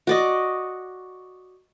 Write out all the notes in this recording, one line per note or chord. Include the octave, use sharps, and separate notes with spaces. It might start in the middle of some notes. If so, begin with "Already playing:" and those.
F#4 D5 D#5